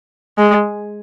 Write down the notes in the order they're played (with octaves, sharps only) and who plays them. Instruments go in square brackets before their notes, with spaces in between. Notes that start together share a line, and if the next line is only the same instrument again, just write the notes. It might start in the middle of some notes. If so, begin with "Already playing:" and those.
[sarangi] G#3